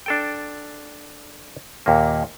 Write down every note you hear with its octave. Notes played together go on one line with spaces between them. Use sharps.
D4 A4 G5
D#2 A#2 A#3